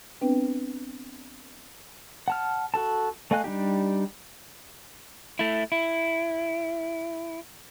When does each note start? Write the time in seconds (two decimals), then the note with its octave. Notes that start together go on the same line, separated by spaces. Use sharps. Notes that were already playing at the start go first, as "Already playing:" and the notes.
0.21 B3 C4 D4 B4 G5
2.28 F#5 A5 F6
2.74 F#4 A4 A5
3.31 A3 D#5 F5 G#5 F#6
3.44 G3 D4 D#4 G4
5.39 A3 E4
5.72 E4